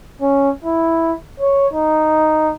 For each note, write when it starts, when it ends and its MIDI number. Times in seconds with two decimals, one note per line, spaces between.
0.21 0.50 61
0.64 1.13 64
1.40 1.68 73
1.73 2.53 63